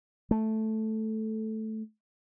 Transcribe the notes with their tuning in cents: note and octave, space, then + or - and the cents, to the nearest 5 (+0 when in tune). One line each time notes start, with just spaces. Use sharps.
A3 -5